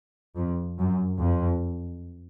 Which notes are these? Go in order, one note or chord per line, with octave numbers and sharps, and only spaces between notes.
F2
F#2
F2